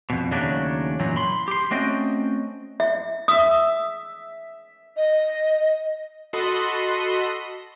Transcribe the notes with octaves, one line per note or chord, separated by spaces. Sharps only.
F2 B2
D#2 C#3 F#3 A3 D4
F#2 A#2 E3 F#3
B5 C6
G4 C6
A3 C4 C#4 F#4 D#5 G5
E5
E5 D#6
D#5
F#4 A4 D#5 B5 C6 D#6